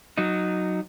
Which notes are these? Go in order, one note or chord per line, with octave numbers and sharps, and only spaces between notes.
F#3 D#4